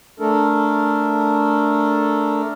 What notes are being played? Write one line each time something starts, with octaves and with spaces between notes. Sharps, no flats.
A3 D4 A4 A#4